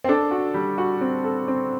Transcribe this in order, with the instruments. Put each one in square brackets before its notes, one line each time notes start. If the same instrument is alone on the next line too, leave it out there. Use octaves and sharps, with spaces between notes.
[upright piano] C4
[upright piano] D4 [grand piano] A4
[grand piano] F#4
G3
F#4
C4
A4
C4